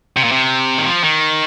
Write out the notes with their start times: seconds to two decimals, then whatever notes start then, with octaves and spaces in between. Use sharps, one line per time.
0.17 C3
0.24 A#2
0.32 C3
0.78 D#3
0.86 F3
1.04 D#3